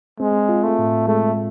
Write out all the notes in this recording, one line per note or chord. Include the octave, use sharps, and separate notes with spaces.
G#3 C4
F4
A3
A2
G#3 A3